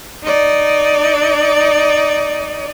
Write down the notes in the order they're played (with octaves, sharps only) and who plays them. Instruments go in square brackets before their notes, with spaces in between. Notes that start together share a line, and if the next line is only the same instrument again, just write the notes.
[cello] D#4 D5